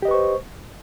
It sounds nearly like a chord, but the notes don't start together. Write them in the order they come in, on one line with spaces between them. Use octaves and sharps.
G4 D#5 B4 C#6 C5